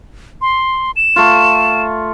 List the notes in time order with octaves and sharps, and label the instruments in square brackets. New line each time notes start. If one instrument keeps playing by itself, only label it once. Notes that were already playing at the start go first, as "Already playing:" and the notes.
[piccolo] C6
E7
[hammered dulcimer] A3 F4